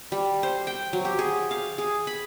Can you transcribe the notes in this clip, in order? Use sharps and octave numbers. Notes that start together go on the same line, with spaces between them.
G3
C5
G5
F#3
G4
G#4
F5
G#4
B5